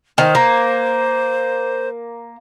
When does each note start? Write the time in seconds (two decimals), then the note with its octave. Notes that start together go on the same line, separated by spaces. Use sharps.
0.18 D#3 C5
0.35 A#3